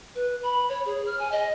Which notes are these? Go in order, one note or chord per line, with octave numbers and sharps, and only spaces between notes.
B4
B5
C#5
G#4
F6
G#5
D#5